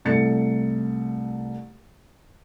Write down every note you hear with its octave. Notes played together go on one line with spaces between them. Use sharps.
C2 A3 A6 C#7